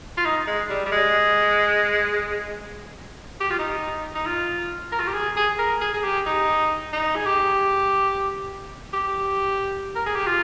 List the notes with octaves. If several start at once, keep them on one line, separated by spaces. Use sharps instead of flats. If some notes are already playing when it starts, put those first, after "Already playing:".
F4
D#4
G#3
G3
G3
G#3
G4
F4
D#4
D#4
F4
A#4
F4
G4
G#4
G#4
A#4
G#4
G#4
G4
D#4
D#4
G#4
G4
G4
A#4
G#4
G4
F4